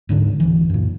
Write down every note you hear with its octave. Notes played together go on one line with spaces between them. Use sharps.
D1 G#2 D3
D1 E3
F#2 A#2